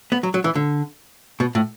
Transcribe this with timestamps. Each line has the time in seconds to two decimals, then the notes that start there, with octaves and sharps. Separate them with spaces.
0.12 B3
0.23 F#3
0.34 F#3
0.44 E3
0.55 D3
1.40 B2
1.55 A2